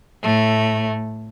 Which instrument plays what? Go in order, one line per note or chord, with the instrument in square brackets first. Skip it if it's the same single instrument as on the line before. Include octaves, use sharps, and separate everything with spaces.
[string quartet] A2 A3